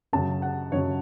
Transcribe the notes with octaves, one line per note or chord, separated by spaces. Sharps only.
F#2 C#3 F#3 A5
F#5
F#2 C#3 F#3 C#5